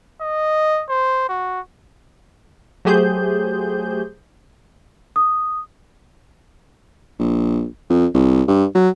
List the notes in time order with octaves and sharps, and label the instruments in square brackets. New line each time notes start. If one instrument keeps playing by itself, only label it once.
[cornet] D#5
C5
F#4
[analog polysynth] F#3 A3 G4 G#4 C5 G6
[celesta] D#6
[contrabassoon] A#1
F2
C2
G2
F#3